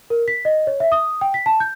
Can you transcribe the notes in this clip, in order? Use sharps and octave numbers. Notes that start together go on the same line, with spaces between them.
A#4
B6
D#5
C#5
E5
D#6
G5
B6
A5
G6